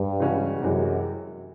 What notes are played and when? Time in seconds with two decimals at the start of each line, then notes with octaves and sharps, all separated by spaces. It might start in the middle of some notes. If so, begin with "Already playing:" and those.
Already playing: G2
0.20 C#3 E3 G#3 C#4 F#4
0.61 F#2 C3 E3 G#3